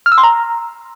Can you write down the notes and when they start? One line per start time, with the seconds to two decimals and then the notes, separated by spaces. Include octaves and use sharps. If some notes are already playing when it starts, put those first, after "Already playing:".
0.06 F6
0.12 E6
0.18 C6
0.23 A#5